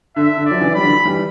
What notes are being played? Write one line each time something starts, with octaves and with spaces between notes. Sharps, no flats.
D3 E5
D3
D5
F#3
C#3 E3
G3 B5
D3 F#3
E3 G3